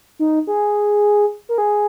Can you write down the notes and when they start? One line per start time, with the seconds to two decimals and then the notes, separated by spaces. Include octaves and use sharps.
0.19 D#4
0.47 G#4
1.49 A#4
1.58 G#4